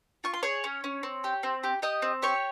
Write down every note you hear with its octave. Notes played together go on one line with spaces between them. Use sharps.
F4 C#6
C6
G#4 C#5 C#6
C#4
C#4
C4
G4
C4
G4
G4 D#5 D#6
C4
G4 C#5 C#6